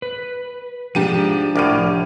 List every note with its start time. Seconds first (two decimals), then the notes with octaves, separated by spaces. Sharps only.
0.02 B4
0.95 G#2 F3 D4 G4 D#7
1.56 C2 A2 D6 F6 D#7